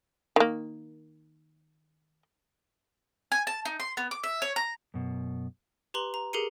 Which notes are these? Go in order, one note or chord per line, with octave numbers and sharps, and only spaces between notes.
D#3 A#3
G#5
A5
D#4
C6
B3
D6
E5
C#5
A#5
F#2 B2
G4 B4 A#5 C6 F#7
A#5
G4 G#4 A#4 C7 C#7 D#7